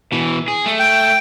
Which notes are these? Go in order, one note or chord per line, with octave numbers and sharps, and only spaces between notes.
B2 E3
G#4
A3
G5